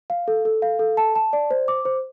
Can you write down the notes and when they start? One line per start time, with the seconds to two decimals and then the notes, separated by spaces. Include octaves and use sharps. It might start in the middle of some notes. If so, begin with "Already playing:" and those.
0.10 F5
0.28 A4
0.45 A4
0.62 F5
0.79 A4
0.97 A5
1.15 A5
1.33 D5
1.51 C5
1.68 D6
1.85 C5